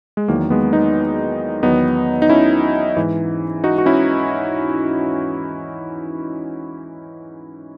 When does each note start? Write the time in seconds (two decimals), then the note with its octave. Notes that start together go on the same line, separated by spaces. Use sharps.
0.17 G#3
0.28 E2 D#3 F#3 A#3
0.50 G#3 B3
0.73 B3 D#4
1.63 E2 D#3 F#3 B3 D#4
2.22 D#4
2.29 C#4 E4
2.97 G#2 E3
3.64 D#4 F#4
3.78 F#4
3.86 C#4 E4